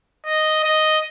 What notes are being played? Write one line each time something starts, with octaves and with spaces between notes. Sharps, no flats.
D#5
D#5